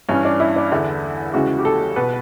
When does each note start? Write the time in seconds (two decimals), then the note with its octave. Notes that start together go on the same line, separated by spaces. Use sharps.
0.09 G2 E3 C#4
0.25 D4
0.40 E4
0.56 D4
0.72 E2 D3 E4
1.34 C#2 C#3 E3 F#4
1.58 G4
1.65 A4
1.96 B2 B4